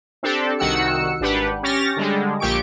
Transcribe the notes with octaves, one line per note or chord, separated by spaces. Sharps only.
C4 D4 G4 A4
C2 D#3 F#4 F#5 E6 C#7
G#1 D4 G4 B4 F#5
C#4 G4 C#6 F6 A6 A#6
D3 G3 G#3
A#1 A#2 G4 C#6 D7